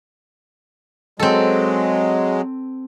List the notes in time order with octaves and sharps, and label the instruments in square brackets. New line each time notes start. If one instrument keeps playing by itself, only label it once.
[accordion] F#3 G#3 [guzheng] C4 A4